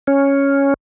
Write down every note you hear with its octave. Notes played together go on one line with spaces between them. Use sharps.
C#4